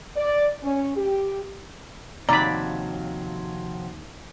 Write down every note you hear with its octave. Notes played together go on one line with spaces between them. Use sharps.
D5
C#4
G4
D#2 C3 F3 F#3 D5 A#5 B5